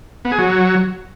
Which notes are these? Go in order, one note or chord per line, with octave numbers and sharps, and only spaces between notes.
B3
G#4
F#3